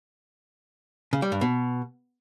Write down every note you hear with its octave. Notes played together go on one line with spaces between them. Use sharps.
C#3
G3
G2
B2